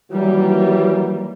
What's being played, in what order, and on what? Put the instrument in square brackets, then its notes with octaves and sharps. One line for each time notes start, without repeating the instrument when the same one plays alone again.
[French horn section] D#3 E3 F#3 [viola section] G3 A#3